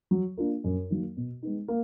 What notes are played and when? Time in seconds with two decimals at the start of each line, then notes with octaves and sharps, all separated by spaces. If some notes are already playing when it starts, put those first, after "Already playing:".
0.11 F#3
0.37 A#3 D4 F4 A#4
0.64 F#2
0.90 D#3 F#3 A#3
1.17 B2
1.43 G#3 B3 D#4
1.68 A#3